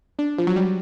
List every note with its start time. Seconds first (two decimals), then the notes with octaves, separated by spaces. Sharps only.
0.19 D4
0.38 F3
0.47 F#3
0.56 G3